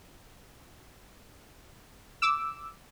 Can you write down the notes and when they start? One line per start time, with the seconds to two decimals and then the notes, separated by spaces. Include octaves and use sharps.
2.22 D6 E6